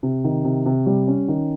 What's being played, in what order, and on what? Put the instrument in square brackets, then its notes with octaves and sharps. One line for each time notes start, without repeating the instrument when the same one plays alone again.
[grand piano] C3
D#3
C3
C3
G3
C#4
D#3